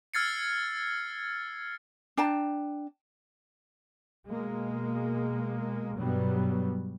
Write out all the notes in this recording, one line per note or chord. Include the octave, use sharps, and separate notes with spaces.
E6 F6 G#6 A6 C7 C#7
D4 G5 A5 A#5
B2 G#3 A#3
G2 B2 F#3 G3 B3